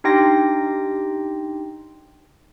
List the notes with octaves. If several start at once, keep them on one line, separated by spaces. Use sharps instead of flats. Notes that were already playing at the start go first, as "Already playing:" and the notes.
D4 D#4 G4 G5 C6 A#6